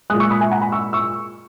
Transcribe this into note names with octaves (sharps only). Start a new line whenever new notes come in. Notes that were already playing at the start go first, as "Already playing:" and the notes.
A#2 G#3 D#6 F#6
C#6 E6
B5 D#6
E5 G#5
F#5 A#5
G#5 B5
C#6 E6
C#6 E6